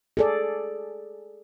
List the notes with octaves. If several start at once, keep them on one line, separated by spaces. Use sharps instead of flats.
G#4 A4 D5